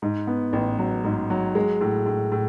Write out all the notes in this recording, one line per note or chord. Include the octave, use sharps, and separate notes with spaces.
G#2
B3
A1
F#3
G#2
F#3
G#3
A2
A2
A2